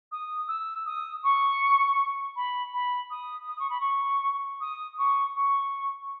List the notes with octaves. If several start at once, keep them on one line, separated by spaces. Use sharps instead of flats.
D#6
E6
D#6
C#6
B5
B5
D#6
D#6
C#6
B5
C#6
D#6
C#6
C#6